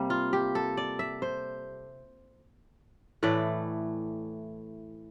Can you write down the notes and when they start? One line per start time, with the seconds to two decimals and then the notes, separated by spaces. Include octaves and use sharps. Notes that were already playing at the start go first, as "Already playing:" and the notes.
Already playing: C3 G3 A#3
0.10 F4
0.33 G4
0.55 A4
0.77 D5
0.99 E5
1.22 C5
3.23 A2 E3 A3 D5